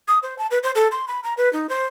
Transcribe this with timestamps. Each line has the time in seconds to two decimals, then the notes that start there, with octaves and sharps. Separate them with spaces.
0.08 D#6
0.23 C5
0.38 A5
0.51 B4
0.63 C5
0.75 A4
0.92 C6
1.08 B5
1.24 A#5
1.37 B4
1.53 D#4
1.69 C5